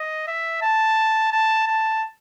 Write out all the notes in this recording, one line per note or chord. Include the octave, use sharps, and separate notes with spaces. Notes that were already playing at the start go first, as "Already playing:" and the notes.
Already playing: D#5
E5
A5
A5
A5